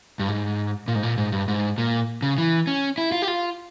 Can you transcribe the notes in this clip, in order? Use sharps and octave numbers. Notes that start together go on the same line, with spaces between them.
G2
G#2
A#2
G#2
A#2
G#2
G2
G#2
A#2
C#3
E3
C#4
E4
F4
G4
F4